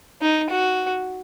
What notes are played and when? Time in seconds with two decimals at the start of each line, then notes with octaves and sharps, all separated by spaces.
0.22 D#4
0.50 F#4